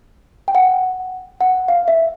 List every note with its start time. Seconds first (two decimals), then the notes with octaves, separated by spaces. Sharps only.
0.48 G5
0.55 F#5
1.41 F#5
1.68 F5
1.88 E5